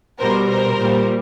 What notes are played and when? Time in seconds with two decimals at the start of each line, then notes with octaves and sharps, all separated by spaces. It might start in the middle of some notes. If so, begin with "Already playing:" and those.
0.20 B2 G3 A#4 C5
0.49 A#4 C5
0.78 A#2 G3